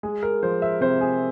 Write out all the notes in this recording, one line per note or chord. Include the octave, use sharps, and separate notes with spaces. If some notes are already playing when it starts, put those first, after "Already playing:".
G#3 G#4
A#4
F3 C5
E5
C3 C5
G#4